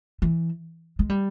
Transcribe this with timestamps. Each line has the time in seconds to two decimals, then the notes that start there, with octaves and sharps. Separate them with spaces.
0.22 E3
0.99 G#3
1.09 G3